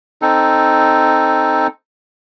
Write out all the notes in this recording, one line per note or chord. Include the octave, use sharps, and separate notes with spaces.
C4 D#4 A4